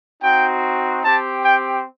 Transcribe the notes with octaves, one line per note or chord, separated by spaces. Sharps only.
C4 D#4 F#4 G5
C4 G4 A5
G5